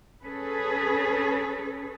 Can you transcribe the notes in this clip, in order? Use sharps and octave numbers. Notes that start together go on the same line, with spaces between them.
C#4 G#4 A4 B4